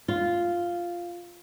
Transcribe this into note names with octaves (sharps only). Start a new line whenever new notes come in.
F4